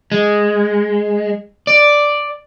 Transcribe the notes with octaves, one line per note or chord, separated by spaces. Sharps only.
G#3
D5